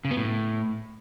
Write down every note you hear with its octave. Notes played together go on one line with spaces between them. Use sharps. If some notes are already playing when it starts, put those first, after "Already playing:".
C#3
B3
A2